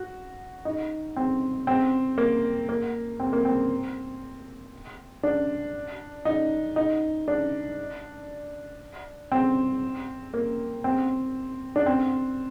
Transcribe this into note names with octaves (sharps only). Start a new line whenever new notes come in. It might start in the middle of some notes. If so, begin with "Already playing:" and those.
Already playing: F#4
D#4
C4
C4
A#3
A#3
C4
A#3
C4
D4
D#4
D#4
D4
C4
A#3
C4
D4
C4